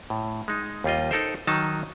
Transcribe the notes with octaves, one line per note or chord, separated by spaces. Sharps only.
A2
G#3 D#4
D#2 G3 F4 D#5
D#4 A4 A#4 C5
D#3 F#3 D#4 A5